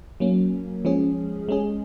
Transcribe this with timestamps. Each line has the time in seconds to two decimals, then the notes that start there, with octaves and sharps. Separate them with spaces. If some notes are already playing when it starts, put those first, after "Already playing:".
0.20 F#3 A#3 C#4
0.85 F3 G#3 C#4 G#4
1.49 G#3 C#4 G#4